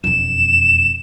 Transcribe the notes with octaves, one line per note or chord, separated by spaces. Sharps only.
E1 F2 E7